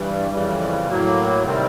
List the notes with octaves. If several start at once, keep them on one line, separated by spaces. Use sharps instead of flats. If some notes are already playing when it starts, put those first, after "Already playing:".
Already playing: G2 E3 G3
F2 C#3 E3 G3
A2 F#3 A#3
C3 D#3 G3 C4